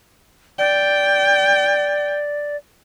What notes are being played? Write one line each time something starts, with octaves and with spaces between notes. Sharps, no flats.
D5 G5